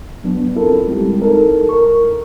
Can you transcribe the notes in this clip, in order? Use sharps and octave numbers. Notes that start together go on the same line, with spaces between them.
F#3 B3 D4
C4 E4 F4 A4 A#4
G3 G#3 C4 E4 G4
D#4 A4 A#4
A#4 C#6